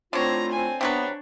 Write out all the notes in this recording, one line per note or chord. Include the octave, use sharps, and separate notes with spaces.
D3 A3 C4 E4 F4 C#5 A#5
C4 G#5
C3 F#3 B3 D4 B4 C#5